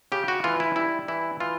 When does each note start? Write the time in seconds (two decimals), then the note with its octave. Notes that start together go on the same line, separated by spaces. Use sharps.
0.12 C#3 G4
0.28 F#4
0.44 E3 F4
0.60 E4
0.76 G3 E4
1.08 E3 E4
1.40 E3 F4